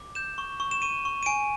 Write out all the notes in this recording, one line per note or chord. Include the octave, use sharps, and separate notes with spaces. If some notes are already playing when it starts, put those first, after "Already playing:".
Already playing: D6
G6 E7
C#6
C#6
E7
C#6 D#7
C#6
D#7
G#5 D7